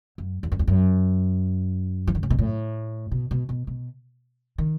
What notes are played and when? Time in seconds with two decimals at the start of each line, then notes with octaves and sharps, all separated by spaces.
0.18 F#2
0.43 E2
0.52 F#2
0.59 E2
0.67 F#2
2.07 E3
2.15 D#3
2.23 C#3
2.30 B2
2.39 A2
3.11 B2
3.31 B2
3.49 B2
3.67 B2
4.58 D#3